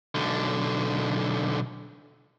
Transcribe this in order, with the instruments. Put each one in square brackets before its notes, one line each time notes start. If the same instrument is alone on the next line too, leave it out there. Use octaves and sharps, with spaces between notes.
[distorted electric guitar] B1 D3